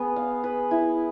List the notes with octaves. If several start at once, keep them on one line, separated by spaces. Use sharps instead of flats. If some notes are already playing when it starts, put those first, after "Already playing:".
Already playing: B3 G#4 B4
F5
B4
E4